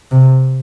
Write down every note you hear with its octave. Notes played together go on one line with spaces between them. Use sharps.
C3